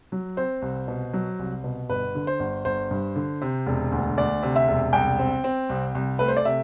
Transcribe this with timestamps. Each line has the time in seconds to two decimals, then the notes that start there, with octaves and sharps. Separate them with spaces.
0.12 F#3
0.37 C4 C5
0.62 C2
0.88 B2
1.13 F#3
1.39 C2
1.64 B2
1.89 G1 B4
2.15 D3
2.27 C5
2.40 G1
2.65 G1 C5
2.91 G2
3.16 D3
3.41 C3
3.66 E1
3.92 D2
4.18 D2 D5
4.43 C3
4.56 E5
4.68 E1
4.93 C2 G5
5.19 C4
5.44 C4
5.69 C2
5.95 C2
6.19 A3 B4
6.28 C5
6.37 D5
6.45 C3 E5